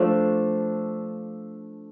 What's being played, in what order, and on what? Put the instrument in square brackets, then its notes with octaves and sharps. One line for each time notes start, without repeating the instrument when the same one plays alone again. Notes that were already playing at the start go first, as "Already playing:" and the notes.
Already playing: [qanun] F3 A3 D4